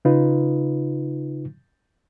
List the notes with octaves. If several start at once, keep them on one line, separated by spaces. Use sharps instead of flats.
C#3 D#4 F4 B4